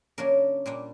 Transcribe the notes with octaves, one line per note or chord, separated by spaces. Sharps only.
C#3 F#3 A#3 D4 A#4
A#2 G3 A#3 D4